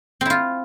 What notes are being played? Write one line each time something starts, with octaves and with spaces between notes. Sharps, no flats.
C4 E4 F4